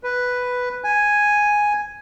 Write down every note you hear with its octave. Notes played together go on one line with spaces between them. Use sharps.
B4
G#5